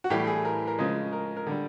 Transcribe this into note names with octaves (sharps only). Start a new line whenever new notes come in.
F#4
A2 E3 G3 G4
G#4
A#4
A#4
C#3 F3 G#3
A#4
A#4
D3 G3